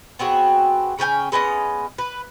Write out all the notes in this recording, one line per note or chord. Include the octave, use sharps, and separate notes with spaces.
B3 C4 F#4 G#4
C#3 C#4 G5 G#5
G#3 B3 C#4 D#5
B4